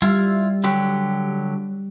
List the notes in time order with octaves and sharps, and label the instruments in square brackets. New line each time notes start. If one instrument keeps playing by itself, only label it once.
[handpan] G3 [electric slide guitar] E4 F4
[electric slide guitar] D3 F#3 G4